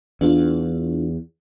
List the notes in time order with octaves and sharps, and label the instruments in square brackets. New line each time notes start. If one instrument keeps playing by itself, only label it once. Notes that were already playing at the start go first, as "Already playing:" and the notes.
[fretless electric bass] E2 [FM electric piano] D4 F4